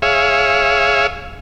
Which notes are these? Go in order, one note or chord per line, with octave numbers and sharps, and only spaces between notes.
G#4 C#5 E5 F5